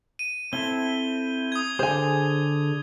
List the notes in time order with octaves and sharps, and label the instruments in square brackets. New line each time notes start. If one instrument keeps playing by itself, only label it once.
[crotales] D#7
[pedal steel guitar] C4 E4 A4 [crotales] G7
[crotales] D#6 G#6
[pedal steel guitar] D3 G#4 [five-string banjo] C5 G#5